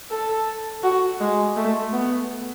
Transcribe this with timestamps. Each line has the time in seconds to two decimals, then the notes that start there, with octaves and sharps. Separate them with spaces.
0.10 A4
0.83 F#4
1.20 G#3
1.57 A3
1.93 B3